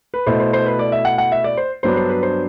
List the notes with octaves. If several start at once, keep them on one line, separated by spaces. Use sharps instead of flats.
B4
B2 A3 E4 C5
C5
C5
B4
D5
E5
F#5
F#5
E5
D5
C5
G2 F#3 B3 D4 C5
C5
B4
C5